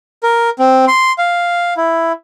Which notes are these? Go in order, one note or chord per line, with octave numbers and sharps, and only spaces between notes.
A#4
C4
C6
F5
E4